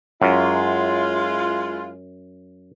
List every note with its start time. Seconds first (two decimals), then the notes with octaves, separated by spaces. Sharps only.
0.22 F#2 G#3 E4 F4